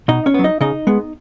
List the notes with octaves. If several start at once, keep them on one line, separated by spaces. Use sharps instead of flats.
B2 D#4 D#5
C#4 C#5
F#3 B3
D#4 D#5
C#3 D#4 D#5
G#3 B3